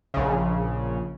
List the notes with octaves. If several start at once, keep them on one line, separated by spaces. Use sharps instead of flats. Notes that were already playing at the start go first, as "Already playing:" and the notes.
A#1 C#3